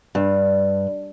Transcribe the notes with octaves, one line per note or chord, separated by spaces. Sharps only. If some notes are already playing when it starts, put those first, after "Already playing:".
G2